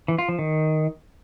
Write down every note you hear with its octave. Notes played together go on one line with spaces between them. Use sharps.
E3
F4
F3
D#3